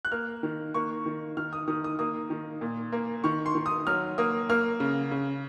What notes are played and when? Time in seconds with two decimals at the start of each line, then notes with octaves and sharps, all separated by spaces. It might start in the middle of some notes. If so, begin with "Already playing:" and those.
0.05 F#6
0.12 A#3 F6
0.43 D#3
0.74 A#3 C#6
1.06 D#3
1.37 D#3 F6
1.53 D#6
1.68 D#3 D#6
1.84 D#6
1.99 A#3 D#6
2.30 D#3
2.61 A#2
2.92 A#3
3.24 D#3 C#6
3.46 C6
3.55 D#3
3.66 D#6
3.87 F#3 F6
4.18 A#3 D#6
4.49 A#3 F6
4.80 C#3
5.11 C#3